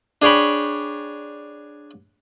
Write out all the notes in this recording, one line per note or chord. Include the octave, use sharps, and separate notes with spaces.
D4 G#4 C#5 G5 B5